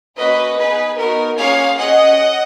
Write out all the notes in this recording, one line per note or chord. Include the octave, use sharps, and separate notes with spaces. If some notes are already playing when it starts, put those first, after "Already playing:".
A#3 C#4 F#4 B4 D#5
B3 D#4 G#4 B4
B3 D#4 F#4 A#4
A#3 C#4 F4 G#4 C#5 F5
C#4 G#4 D#5 F#5